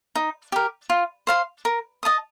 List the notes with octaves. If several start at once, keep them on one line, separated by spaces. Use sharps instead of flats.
D#4
G4 A#4
F4
C5 F5 C6
A#4
D#5 A5 D#6